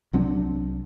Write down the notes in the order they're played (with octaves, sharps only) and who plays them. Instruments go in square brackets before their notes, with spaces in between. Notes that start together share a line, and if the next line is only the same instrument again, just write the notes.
[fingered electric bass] C2 F#3 C4 D4